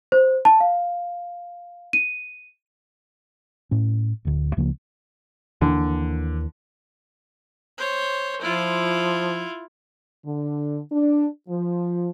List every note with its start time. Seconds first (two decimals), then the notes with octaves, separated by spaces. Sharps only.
0.12 C5
0.45 A5
0.60 F5
1.93 D#7
3.71 A2 C#4
4.25 D1 D2
4.57 C#2 C#3 F3 A#3
5.61 D#2 D3 E3 A#3
7.78 C5 C#5
8.41 F3 E4 F4
10.25 D3
10.92 D4
11.49 F3